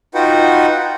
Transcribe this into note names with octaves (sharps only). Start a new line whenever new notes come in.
D#4 F4 F#4 B4 F#5 G5